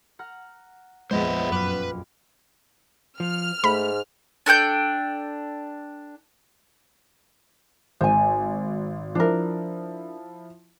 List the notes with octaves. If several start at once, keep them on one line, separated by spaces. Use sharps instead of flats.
F#5 A#5 F6
A#1 F2 G#3 B3 C5 D#5 E5
F#2 B4 F5 D6
F3 F6
G#2 A3 B5
D4 A4 G5 G6
G#1 C5 G#5
F3 D4 E4 A#4